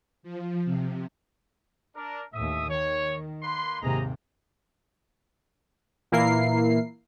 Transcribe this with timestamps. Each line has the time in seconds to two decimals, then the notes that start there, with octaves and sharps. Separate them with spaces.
0.23 F3
0.65 C3
1.96 D4 A#4
2.34 D#2 A2 E5 D#6
2.69 D#3 C#5
3.43 A#3 B4 C6
3.82 D#2 G#2 C3 G#4 D#5 A#5
6.12 A#2 E3 A#3 E4 A#4 C7